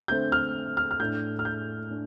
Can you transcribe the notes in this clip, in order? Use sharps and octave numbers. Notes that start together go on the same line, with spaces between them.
D3 A3 C4 G6
F6
F6
F6
A2 A3 D4 G6
F6
G6
D4